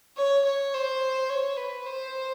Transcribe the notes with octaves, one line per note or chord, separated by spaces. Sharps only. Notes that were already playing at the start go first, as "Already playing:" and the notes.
C#5
C#5
C5
C#5
B4
C5